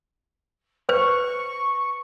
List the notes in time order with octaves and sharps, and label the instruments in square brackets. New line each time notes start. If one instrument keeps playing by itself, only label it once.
[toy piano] B4 C5 [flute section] C#6